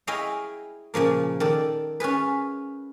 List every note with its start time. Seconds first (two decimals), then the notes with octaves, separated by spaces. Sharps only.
0.07 E4 G#4 C#5 D#5 F5 G5
0.94 A#2 C#3 F3 A#3
1.40 D#3 A4 D5
2.00 C#4 F4 G#4 B4